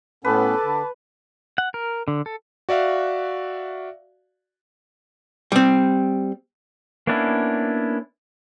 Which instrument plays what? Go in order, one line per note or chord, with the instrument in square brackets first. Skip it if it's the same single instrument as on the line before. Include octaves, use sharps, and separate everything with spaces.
[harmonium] A2 B3 C#4 [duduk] A4 [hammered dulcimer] B4 [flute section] A5 B5 D6
[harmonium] D3
[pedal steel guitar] F#5
A#4
D3
A4
[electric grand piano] F#4 D5 E5 F5
[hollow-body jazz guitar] G3 C4
[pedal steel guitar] A#3 B3 C#4 D4 E4